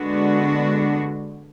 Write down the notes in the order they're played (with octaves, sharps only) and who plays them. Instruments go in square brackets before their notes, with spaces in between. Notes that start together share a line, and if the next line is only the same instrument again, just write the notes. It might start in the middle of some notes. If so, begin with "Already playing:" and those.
Already playing: [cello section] D3 G#3 B3 D4 F#4